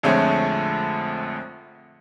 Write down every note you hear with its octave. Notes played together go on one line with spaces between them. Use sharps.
A#1 F2 D3 G#3 A3 C#5